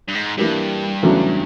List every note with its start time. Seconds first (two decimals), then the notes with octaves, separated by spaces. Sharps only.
0.08 G2
0.15 G#2
0.38 G2 E3 G3 A#3 D4 G4
1.03 E2 C#3 F#3 A3 D4